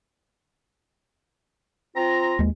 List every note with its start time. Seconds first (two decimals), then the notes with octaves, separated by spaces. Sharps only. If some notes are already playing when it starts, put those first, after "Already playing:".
1.96 C4 F4 A#5
2.39 D#2 G#3